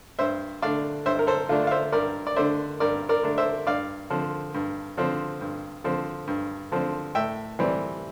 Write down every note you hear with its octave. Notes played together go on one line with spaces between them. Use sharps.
G2 C5 E5
D3 A3 D4 D5 F5
G2 C5 E5
A#4
A4 C5
D3 A3 D4 F4
F5
C5 E5
G2 A#4 D5
D5
D3 A3 D4 C5 E5
G2 A#4 D5
A#4 D5
D3 A3 D4
C5 E5
G2 D5 F5
D3 F3 C4
G2
D3 F3 C4
G2
D3 F3 C4
G2
D3 F3 C4
A2 E5 G5
E3 G3 C4